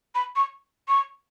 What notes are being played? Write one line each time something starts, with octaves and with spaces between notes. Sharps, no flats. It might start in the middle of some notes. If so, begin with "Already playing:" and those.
B5
C#6
C#6